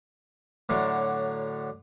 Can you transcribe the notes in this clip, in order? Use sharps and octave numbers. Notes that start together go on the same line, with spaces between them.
A2 D3 F#3